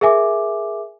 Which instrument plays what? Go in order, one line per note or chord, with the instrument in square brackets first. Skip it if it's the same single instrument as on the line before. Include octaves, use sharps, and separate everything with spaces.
[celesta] G#4 A#4 E5 G#5 D6